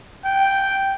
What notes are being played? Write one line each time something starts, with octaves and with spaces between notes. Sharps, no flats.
G5